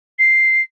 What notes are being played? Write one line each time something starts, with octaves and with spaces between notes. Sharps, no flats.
C7